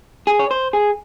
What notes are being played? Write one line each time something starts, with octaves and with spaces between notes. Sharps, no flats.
G#4
C#5
C5
G#4